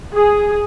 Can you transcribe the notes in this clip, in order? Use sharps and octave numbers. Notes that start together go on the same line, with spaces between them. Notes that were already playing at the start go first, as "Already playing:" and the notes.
G#4